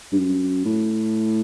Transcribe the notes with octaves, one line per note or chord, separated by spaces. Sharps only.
G2
F#2
A2